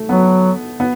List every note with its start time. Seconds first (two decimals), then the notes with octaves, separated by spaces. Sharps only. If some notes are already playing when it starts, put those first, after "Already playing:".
Already playing: A3
0.09 F#3 B3
0.80 B3